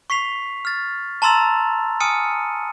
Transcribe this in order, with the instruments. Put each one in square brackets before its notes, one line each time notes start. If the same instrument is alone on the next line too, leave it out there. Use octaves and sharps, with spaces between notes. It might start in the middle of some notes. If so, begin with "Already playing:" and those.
[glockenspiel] C#6 B6 C7 F7
F6 A6
A5 A#5 C6 E6 A6 F7
G#5 D#6 F6 C#7 D#7